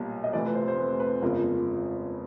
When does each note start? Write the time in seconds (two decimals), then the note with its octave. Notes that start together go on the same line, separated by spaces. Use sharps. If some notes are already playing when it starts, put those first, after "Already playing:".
Already playing: B1 A#2 G3 A#3
0.24 D#5
0.33 F1 F2 C3 E3 A3 D5
0.46 B4
0.55 C5
0.68 C5
0.78 B4
1.00 B4
1.22 G1 F2 C#3 F3 G#3 A#4